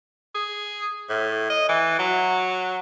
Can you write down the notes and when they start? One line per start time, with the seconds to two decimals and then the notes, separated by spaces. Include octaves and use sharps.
0.35 G#4
1.10 A2
1.50 D#5
1.69 E3
1.99 F#3